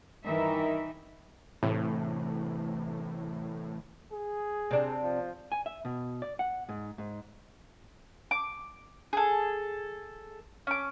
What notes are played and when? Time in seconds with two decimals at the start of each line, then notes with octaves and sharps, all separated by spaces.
0.25 G2 D#3 E3 D#4 A#4 E5
1.63 A2 C3 E3 A3
4.12 G#4
4.71 C3 D4
5.03 F3
5.52 G#5
5.66 E5
5.85 B2
6.22 D5
6.39 F#5
6.69 G#2
6.98 G#2
8.31 D6
9.13 G#4 A4
10.67 C#4 D6